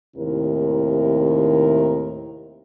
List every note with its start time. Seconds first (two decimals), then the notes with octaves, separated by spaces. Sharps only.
0.17 D#2 A2 C3 D#3 E4 A#4